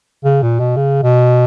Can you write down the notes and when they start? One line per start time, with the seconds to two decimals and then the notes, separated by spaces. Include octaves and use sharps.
0.24 C#3
0.42 A#2
0.59 B2
0.76 C#3
1.03 B2